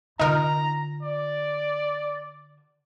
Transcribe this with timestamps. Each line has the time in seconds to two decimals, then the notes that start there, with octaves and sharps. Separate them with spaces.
0.19 D3 D#4 F4 A#4 A#5
1.03 D5